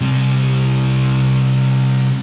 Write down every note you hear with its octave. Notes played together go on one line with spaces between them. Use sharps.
C3 G3